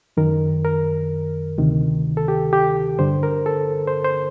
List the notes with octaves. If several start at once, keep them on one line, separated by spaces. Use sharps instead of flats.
F#2 D#3 A#4
A#4
D2 C3 D#3
A4
G4
G4
G2 D3 C5
A#4
A4
C5
C5